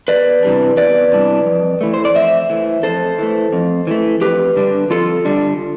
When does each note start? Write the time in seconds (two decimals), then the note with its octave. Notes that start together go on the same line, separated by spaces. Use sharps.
0.08 E2 B4 D5
0.43 C3 E3 G3 D4
0.77 E2 B4 D5
1.11 C3 E3 G3 D4
1.46 F2
1.81 E3 A3
1.94 C5
2.05 D5
2.15 F2 C5 E5
2.50 E3 A3
2.83 F2 A4 C5
3.18 E3 A3
3.53 F2
3.87 E3 A3
4.21 F2 G4 B4
4.56 D3 G3 D4
4.90 F2 F4 A4
5.25 D3 G3 D4